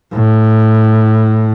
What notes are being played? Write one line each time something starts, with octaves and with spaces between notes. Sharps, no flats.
A2